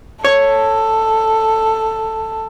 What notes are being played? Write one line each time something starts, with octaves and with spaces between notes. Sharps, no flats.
A4 C#5